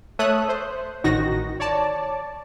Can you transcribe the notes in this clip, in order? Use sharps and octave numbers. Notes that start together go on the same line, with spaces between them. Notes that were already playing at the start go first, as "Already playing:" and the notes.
A3 A4 C#5 E5 D#6 F#6
C5
A1 D#3 D#4 F#4 A#6
C#5 D5 A5